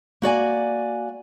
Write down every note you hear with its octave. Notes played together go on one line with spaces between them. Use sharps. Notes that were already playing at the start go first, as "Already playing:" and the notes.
A#3 F#4 D5 G#5